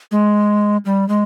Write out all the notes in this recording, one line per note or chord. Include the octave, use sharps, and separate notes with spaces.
G#3
G3
G#3